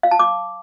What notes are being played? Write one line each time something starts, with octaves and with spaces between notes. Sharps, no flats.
F5
A5
D6